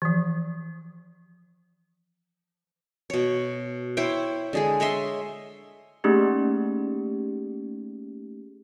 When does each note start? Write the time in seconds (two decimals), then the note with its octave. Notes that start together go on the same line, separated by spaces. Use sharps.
0.02 E3 F3
3.10 B2 C#5
3.97 E4 C5 C#5 G5
4.53 D3 G#3 G#4
4.80 C#5 D#5 E5 C6
6.04 A3 A#3 C#4 D#4 G4 G#4